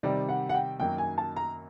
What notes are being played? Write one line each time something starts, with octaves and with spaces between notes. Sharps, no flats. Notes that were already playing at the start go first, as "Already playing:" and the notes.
C3 D#3 G3 D5
F#5
F#5
G5
F#2 D#3 F#3 A#3 D#4 G5
G#5
A5
A#5